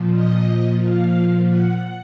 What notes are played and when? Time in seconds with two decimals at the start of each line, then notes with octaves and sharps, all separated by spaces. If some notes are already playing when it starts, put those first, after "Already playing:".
Already playing: A#2 F3
0.13 D#5
0.81 F5
1.49 F#5